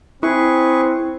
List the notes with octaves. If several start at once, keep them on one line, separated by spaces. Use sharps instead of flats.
C4 E4 G#4 B4 C#6